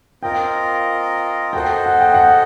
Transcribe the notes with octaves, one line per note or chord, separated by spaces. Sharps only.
C4 F4 A#4 D#5 G5
F#4 A4 C5 D#5 G5
F#5
G5
F#5